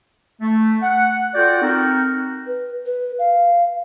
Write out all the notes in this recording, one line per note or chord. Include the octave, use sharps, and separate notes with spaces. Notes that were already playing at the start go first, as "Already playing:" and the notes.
A3
F#5
F4 F#4 A4 D5 F#5 G5
C4 D#4 F#4 A#4
B4
B4
F5